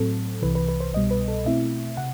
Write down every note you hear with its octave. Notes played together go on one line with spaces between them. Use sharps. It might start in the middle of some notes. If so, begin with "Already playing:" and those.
Already playing: A2 F#3 C4 A4
C2 C3 E3 B4
B4
B4
C5
C2 B2 G3 D#5
B4
A4
B2 A3 C4 E4 E5
C3 F#5